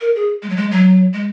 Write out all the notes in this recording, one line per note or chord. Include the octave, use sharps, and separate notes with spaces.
A#4
G#4
G#3
F#3
G#3
F#3
G#3